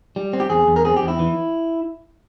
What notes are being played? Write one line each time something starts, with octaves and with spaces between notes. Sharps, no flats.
G3
C4
G4
E2 G#4
E2
A#4
C4 G#4
G4
E2
E4
E3